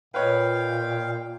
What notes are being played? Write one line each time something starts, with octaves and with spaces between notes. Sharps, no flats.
A#2 B4 C#5 D#5 F5 G5